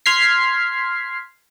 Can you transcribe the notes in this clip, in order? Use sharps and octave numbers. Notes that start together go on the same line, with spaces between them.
C6 F6 G#6 B6 C7